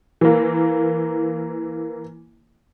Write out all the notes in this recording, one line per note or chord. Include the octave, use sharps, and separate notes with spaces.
E3 A#3